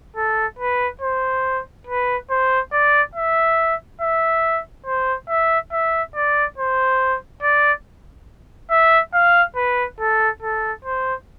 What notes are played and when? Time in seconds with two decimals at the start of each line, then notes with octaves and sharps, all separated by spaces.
0.16 A4
0.59 B4
1.01 C5
1.87 B4
2.30 C5
2.72 D5
3.15 E5
4.01 E5
4.86 C5
5.29 E5
5.73 E5
6.15 D5
6.58 C5
7.43 D5
8.71 E5
9.14 F5
9.56 B4
10.00 A4
10.42 A4
10.85 C5